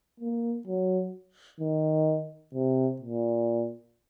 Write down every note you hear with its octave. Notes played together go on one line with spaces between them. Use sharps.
A#3
F#3
D#3
C3
A#2